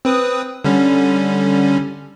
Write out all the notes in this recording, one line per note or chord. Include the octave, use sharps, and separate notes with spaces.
C4 B4 D#6
D3 G3 C#4